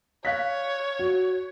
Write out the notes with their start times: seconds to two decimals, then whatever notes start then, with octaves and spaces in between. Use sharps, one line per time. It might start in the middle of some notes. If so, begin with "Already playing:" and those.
0.25 C#5 F5 F#6 B6
0.99 F#4